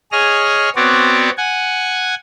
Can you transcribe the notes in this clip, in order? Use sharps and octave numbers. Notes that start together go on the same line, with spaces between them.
G#4 C#5 D#5 F6
B3 C4 F#4 C#5 D5
F#5 G#5